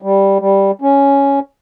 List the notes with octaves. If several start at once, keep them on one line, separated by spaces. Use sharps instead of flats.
G3
G3
C#4